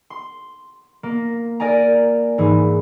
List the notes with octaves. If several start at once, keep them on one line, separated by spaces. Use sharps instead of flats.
C6
A#3
A#4 D5 G#5 A#5
G#2 E3